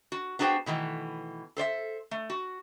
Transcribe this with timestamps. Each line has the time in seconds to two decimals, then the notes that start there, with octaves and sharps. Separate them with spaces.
0.12 F#4
0.39 B3 D4 F#4 G#4 C5 G5
0.66 B2 D#3 E3 A3
1.57 A4 C5 D5 E5
2.11 A3
2.30 F#4